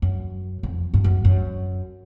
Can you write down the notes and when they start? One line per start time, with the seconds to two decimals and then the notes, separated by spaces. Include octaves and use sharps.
0.02 F#2
0.63 F2
0.94 G2
1.04 F#2
1.25 F#2